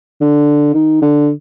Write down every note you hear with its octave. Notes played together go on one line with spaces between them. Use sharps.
D3
D#3
D3